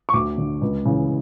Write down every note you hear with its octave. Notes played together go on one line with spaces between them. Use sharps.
C#6
D2 D6
D3
C#2
C#3 E3